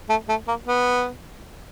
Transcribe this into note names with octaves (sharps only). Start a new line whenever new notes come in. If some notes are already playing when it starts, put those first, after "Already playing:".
A3
A3
A#3
B3